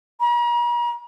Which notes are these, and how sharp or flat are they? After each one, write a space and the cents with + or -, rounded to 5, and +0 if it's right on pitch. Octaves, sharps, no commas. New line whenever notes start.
A#5 +45